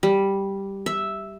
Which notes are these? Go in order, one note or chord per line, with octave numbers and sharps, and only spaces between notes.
G3
E5